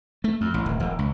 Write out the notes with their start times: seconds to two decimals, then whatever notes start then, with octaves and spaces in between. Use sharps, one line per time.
0.24 A3
0.41 F2
0.54 A1
0.66 D1
0.80 E1
0.99 C#2